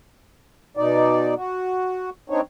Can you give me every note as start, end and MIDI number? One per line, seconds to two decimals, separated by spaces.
0.77 1.34 47
0.77 1.34 63
0.77 1.34 74
1.36 2.10 66
2.30 2.41 60
2.30 2.41 62
2.30 2.41 63
2.30 2.41 73